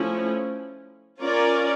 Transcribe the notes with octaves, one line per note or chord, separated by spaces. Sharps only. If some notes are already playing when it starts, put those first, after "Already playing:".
Already playing: F3 A3 C#4 E4
C#4 F4 A#4 D5